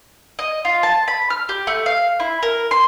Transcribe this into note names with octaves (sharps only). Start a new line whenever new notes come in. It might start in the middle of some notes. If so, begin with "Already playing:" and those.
D#5
F4
A5
B5
F6
G4
A3
F5
E4
A#4
C6